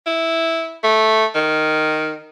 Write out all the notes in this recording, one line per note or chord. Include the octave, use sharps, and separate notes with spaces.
E4
A3
D#3